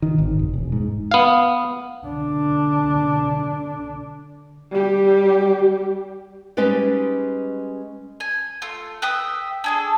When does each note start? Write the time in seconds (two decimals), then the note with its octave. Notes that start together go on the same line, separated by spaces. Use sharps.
0.02 D#3
0.18 G#1
0.39 F1
0.54 E1
0.72 G#2
1.11 B3 F5
2.07 D3 D4
4.71 G3 G4
6.57 G3 G#3 C#4 D#4 B4 D5
8.20 G#5
8.62 A3 F4
9.02 B4 E5 G5 D#6
9.64 D4 G#4 A4